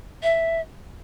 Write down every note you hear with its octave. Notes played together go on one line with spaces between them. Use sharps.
E5